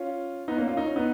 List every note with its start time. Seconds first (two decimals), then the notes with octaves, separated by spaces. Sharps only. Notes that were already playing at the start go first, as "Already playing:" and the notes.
Already playing: C#4 F4
0.48 B3 D#4
0.57 A#3 C#4
0.68 C#4 F4
0.77 D#4
0.88 C#4
0.96 B3 D#4